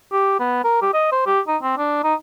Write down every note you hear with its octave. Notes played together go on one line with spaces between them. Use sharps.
G4
B3
A#4
G4
D#5
C5
G4
D#4
C4
D4
D#4